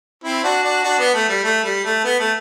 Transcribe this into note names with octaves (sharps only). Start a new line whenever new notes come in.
C4 E4
D4 F#4
D4 F#4
D4 F#4
B3
A3
G3
A3
G3
A3
B3
A3